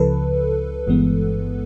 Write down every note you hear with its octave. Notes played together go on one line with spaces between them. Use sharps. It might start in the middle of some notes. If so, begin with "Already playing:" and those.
Already playing: C#2 C#3 F3 A4 B4
G1 G2 E3 G#3 B3